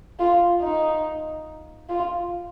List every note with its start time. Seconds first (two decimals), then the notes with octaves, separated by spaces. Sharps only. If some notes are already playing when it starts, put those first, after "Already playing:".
0.19 F4
0.62 D#4
1.89 F4